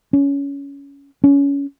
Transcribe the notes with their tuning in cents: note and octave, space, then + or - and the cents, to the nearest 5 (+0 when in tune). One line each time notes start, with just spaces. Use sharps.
C#4 +20
C#4 +20